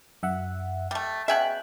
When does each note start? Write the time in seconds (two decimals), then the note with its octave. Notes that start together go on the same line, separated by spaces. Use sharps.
0.23 F#2 E5 F#5
0.91 G3 A3
1.28 B2 C#4 G#4 E5 G5 F#6